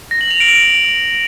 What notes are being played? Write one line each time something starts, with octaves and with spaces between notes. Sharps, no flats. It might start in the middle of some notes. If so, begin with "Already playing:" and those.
A#6
F#7
F7
D7
F#7